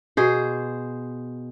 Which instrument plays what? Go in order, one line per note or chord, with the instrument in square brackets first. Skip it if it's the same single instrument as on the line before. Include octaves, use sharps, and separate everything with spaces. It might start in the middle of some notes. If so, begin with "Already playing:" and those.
[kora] B2 G#4 C5